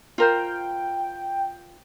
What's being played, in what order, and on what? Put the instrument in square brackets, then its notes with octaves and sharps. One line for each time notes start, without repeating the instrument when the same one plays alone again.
[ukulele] F4 A#4 C5 [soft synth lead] G5